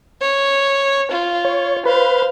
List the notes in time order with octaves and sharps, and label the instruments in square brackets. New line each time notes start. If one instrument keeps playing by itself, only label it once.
[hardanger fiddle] C#5
F4
[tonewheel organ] C#5
[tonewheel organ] B4 [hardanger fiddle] C5 F5